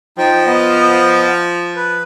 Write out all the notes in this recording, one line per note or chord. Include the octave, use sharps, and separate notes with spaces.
F3 D#4 G5
B3 D#5
B4